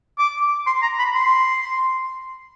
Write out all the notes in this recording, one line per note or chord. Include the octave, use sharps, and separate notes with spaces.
D6
C6
A#5
B5
C6